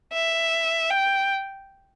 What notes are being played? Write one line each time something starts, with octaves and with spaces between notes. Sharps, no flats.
E5
G5